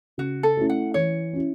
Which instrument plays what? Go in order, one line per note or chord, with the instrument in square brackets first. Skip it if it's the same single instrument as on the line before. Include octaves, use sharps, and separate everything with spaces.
[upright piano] C#3 [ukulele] F#4
[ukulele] A4
[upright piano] A3 C#4 E4
[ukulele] F#5
[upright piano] E3 [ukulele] C#5
[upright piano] C#4 E4